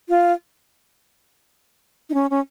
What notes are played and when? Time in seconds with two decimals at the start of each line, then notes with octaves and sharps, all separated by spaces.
0.09 F4
2.10 D#4
2.14 C#4
2.30 C#4